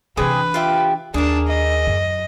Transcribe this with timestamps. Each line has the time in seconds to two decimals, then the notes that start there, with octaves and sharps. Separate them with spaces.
0.17 C3 E3 D4 G#4 B4 G#5
0.54 F4 G4 E5
1.14 D#2 D4 G#4 A#4 A5
1.47 D#5
1.87 F#2